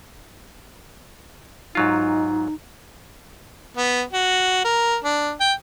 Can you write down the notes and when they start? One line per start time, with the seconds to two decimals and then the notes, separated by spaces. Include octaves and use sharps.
1.75 G#2 F#3 D#4 F4
3.77 B3
4.13 F#4
4.65 A#4
5.04 D4
5.40 G5